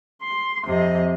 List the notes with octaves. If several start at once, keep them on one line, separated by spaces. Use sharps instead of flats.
C6
F2 C3 D#5